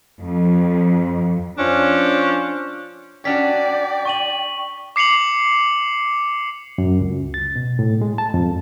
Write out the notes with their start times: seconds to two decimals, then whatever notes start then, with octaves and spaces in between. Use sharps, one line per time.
0.21 F2
1.58 F3 C#4 D4
3.25 C#4 D4 F#4 D5 G5 B6
4.05 C#6 D#7 F#7
4.96 D6 C7 C#7 F7 F#7
6.78 F#2
7.01 C#2
7.34 A6
7.56 B2
7.79 A2
8.01 G#3
8.18 A5
8.34 F2